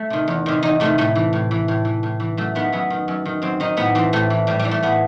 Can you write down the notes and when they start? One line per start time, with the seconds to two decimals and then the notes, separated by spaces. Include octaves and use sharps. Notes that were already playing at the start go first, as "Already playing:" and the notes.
Already playing: A3
0.10 C3 D#3
0.28 E2
0.46 C3 D#3
0.63 E2 D#4
0.80 C3 D#3 A3
0.98 A2 A3
1.15 E3
1.33 A2
1.51 E3
1.68 A2
1.85 E3
2.03 A2
2.20 E3
2.37 F#2 A3
2.55 D#3 B3
2.72 F#2 B3
2.90 D#3
3.08 F#2
3.25 D#3
3.42 F#2 C4
3.60 D#3 D#4
3.77 A2 B3
3.95 E3 C4
4.13 A2 A3
4.30 E3
4.47 A2 G3
4.59 G3
4.65 E3
4.71 A3
4.82 A2 B3